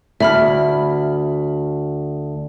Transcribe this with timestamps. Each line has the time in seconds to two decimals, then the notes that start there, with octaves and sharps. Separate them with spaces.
0.20 D2 E5 B5 F6